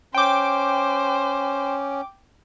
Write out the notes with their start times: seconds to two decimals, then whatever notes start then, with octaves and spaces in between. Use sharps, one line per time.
0.14 C#4 C5 G5 D6